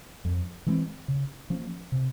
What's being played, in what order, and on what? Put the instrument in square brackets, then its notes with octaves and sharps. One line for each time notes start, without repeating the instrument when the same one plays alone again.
[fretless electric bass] F2
E3 G#3 C4
C#3
F3 A#3 C#4
C3